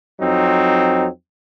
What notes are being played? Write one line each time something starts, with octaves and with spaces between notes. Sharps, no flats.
F2 F#3 C4 D#4